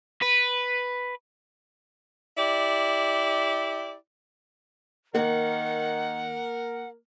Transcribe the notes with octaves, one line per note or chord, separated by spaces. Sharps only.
B4
E4 G4 D5
D#3 A#3 A#4 F#5